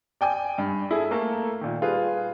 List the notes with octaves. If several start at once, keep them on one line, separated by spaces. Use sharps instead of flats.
D5 G5 G#5 D6
G2
E4 G#4 A4
A3 A#3 A4 A#4 A5
A#2 D#3
G3 F4 G#4 B4